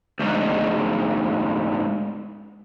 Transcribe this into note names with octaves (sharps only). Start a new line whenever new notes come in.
D2 G#2